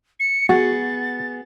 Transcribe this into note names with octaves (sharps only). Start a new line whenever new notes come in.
C#7
B3 F#4 G#4 A6